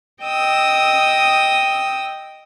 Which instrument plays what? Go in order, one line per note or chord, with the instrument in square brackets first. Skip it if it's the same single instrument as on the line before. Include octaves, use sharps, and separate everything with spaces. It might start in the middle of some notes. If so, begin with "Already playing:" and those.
[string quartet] D#5 G5 D#6 E6